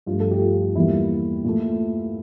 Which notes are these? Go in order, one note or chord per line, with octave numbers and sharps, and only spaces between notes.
G2 F3 A3 F4
A4
G4
F4
E2 E3 G3 A#3 E4
A#2 A3